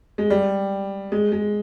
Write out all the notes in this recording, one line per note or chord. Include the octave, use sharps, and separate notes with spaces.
G#3
G3
G#3
G#3